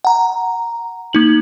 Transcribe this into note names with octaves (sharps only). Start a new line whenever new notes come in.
F#5 A#5
A#3 D#4 F#7